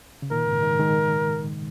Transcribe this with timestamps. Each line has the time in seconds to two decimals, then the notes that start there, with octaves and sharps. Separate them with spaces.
0.22 C#3
0.31 A#2 D#3 A#4
0.47 G#2 C#3
0.62 D#3 G#3
0.79 D#3 G#3